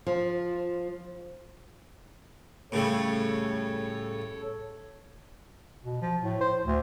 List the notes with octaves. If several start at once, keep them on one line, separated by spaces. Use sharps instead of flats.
F3
A2 C#3 G3 A4 C#5
B2
F3
A2
C5
D2